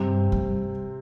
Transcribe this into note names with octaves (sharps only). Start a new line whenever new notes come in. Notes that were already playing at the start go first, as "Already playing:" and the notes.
Already playing: G2 C3 C4
G2